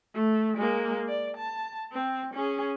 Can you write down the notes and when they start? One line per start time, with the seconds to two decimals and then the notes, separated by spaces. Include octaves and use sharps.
0.14 A3
0.57 G#3 A#3
1.08 D5
1.37 A5
1.93 C4
2.34 C#4 G#4